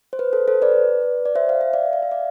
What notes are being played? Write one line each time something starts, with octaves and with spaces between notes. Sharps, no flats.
C5
B4
A4 C5
A4 C5
B4 D5
D5
C5 E5
F5
E5
D5 F5
F5
E5
D5 F5